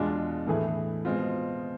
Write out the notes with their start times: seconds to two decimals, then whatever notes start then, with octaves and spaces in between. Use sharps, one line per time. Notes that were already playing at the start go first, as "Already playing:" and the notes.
Already playing: E2 B2 G#3 D4 F4
0.47 A2 E3 A3 E4 G#4
1.05 B2 G#3 C4 F4